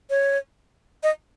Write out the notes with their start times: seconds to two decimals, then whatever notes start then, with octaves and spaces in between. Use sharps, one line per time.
0.10 C#5
1.03 D#5